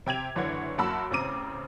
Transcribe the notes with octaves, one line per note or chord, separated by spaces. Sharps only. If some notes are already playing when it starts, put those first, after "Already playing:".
C3 G5 G#6 F7
F#1 D3 E3 C#5 F#5 G#6
F#2 A#3 F#4 A5 B5 E6
A1 C#3 C4 A#5 D6 D#7